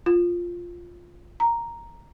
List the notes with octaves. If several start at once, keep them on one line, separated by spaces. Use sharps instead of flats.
F4
A#5